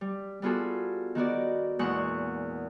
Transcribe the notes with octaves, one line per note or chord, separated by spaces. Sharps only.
G3
G3 B3 F4 F#4 G#4 A4
D#3 B3 F#4 D5
E2 A#2 G#3 F#5 C#6